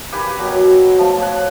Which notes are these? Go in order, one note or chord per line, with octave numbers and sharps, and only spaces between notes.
G4 A#4 B4 G#5
B2 F#3 A#4
F3 A3
C#5 F#5